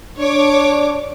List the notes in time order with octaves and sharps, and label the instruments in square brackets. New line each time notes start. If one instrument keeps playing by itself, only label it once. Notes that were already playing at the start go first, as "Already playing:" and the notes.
[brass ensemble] D4 [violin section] C#5 D6